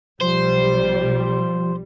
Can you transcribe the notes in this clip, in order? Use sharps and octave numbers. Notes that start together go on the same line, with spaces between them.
B1 F3 G3 C5